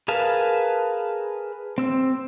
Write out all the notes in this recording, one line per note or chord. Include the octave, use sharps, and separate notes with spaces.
G#4 A#4 B4 F5 A5
C4 E6